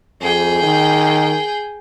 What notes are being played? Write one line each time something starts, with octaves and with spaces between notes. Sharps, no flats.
F2 G#4 G5
D#3